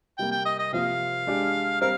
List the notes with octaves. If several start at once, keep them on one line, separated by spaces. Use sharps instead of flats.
C3 G3 A#3 G5
G5
D#5
D#5
C3 F3 A#3 F4 F5
G#3 D4 G4 D5
G3 C4 A#4 F5